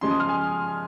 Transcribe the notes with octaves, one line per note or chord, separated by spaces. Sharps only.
C#3 F3 G#3 C6
D#6
F6
G#5